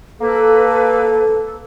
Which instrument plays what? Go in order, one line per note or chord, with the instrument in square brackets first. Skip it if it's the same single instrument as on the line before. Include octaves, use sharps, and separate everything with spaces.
[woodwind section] A#3 B4 [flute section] A4